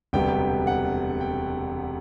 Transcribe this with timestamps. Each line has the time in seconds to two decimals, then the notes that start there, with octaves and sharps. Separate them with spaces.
0.13 E1 D2 C3 G3 B3 G5
0.67 F#5
1.21 G5